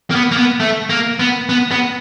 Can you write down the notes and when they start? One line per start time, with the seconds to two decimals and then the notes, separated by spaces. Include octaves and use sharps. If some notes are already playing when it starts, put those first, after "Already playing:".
0.11 A#3
0.15 B3
0.32 A#3
0.37 B3
0.60 A3
0.90 A#3
1.19 B3
1.49 B3
1.71 B3